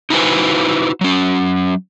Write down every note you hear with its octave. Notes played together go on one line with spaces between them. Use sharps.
D#4 E4 F#4 B4 C5 G#5
F#3 C#4